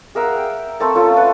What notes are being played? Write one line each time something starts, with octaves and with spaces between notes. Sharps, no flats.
G#4 A#4 E5 F#5
G5
A3 C4 A4 A#4
C#4 F4 A4
B4 F#5